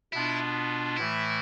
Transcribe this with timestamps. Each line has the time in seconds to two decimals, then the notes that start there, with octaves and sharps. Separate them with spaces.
0.13 B2 B3 D4 E4 F4
0.97 A2 E3 A3 E4